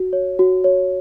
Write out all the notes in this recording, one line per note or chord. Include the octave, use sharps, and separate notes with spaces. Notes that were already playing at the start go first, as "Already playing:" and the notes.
Already playing: F#4
C#5
F#4
C#5